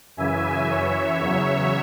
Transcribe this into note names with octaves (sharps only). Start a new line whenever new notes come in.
F#2 C#3 E3 E5 G#5
F#2 E3 C#5 E5
E2 C#3 F#3